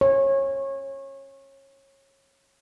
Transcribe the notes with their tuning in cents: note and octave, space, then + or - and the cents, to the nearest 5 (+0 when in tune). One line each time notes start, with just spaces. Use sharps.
C#5 -25